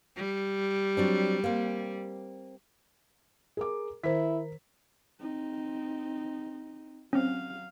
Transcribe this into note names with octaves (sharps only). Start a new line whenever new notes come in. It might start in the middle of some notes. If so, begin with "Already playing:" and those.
G3
F#3 C4 D4
A#3 C4
G#4 A#4 D6
D#3 E4 A#4 C5 B6
C4 D#4
F#3 C4 C#4 F5